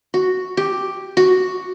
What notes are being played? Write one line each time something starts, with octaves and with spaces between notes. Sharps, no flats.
F#4
G4
F#4